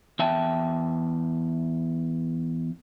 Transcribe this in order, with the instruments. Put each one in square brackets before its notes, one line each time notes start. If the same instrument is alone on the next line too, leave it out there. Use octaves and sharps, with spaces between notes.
[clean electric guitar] E2 E5 G5 A5